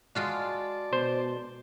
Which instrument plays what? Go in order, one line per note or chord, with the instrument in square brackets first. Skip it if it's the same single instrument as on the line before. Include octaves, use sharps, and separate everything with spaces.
[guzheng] G#3 F4 F#4 [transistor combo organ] D5 A5
[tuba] B2 [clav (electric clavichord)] C5